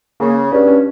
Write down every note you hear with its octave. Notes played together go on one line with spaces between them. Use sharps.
C#3 A#3
G2 C#4
C#4